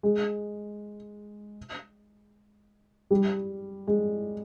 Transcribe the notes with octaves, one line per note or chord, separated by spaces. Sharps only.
G#3
G3
G#3